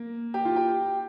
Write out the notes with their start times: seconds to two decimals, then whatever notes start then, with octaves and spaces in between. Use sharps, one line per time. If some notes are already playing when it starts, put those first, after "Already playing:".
Already playing: A#3
0.34 G4
0.45 F4
0.56 G4